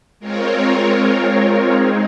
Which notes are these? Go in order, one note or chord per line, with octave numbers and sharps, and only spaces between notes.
G#3 C4 F4 A#4 C#5
G#3 C4 D#4 G#4